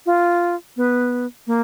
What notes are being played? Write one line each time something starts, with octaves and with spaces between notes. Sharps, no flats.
F4
B3
A#3